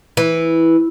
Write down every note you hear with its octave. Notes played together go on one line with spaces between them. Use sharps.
E3